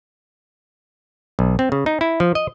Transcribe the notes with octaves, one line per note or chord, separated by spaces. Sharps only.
B1
C4
C#3
D#4
E4
F3
D#5